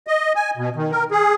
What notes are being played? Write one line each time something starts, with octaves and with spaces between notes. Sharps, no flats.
D#5
G#5
B2
D#3
A#4
G#4